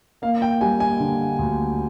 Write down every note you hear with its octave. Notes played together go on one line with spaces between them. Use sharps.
A#3 F5
G5
G3 G#5
G#5
D3
D2